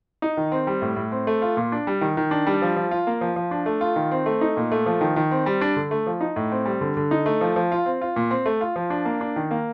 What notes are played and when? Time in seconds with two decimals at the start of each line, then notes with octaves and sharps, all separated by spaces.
0.22 D#4
0.37 D#3
0.52 C4
0.67 G3
0.82 A2
0.96 A2
1.12 C4
1.27 A3
1.42 F4
1.57 A#2
1.72 D4
1.87 G3
2.01 D#3
2.17 D#3
2.31 D4
2.47 G3
2.62 F3
2.76 F3
2.91 F4
3.07 A#3
3.21 F3
3.36 F3
3.51 D4
3.66 A3
3.81 F4
3.96 D#3
4.11 C4
4.26 A3
4.41 D#4
4.57 A#2
4.72 A3
4.86 F3
5.01 D#3
5.16 D#3
5.31 C4
5.46 G3
5.61 D4
5.76 D3
5.91 A3
6.07 F3
6.21 D#4
6.36 A2
6.52 C4
6.66 G3
6.81 D3
6.97 D3
7.11 D#4
7.26 A3
7.41 F3
7.56 F3
7.72 F4
7.86 C4
8.01 F4
8.16 A#2
8.31 C4
8.46 A3
8.61 F4
8.76 F3
8.90 D4
9.05 A#3
9.21 D4
9.36 D#3
9.51 A#3